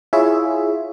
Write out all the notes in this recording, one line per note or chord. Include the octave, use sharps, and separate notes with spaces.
E4 F4 G#4 C#5 E5